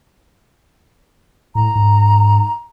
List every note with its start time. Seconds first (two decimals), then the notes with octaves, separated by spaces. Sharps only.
1.55 A2 A#5
1.75 G#2